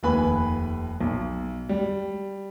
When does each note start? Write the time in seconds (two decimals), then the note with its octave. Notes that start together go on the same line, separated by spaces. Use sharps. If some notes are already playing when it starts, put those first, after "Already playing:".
0.03 F1 D#2 B4 G#5 B5
1.01 B1
1.69 G3